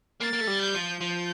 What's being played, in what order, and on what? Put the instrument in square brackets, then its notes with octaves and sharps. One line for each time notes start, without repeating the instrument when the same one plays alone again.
[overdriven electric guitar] A#3 [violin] A6
[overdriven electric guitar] A#3
A3
G3
[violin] G6
[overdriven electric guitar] F3
[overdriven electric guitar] F3 [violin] G6